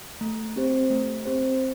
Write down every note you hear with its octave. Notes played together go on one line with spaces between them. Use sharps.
A3
C4 G4 C5
A3
C4 G4 C5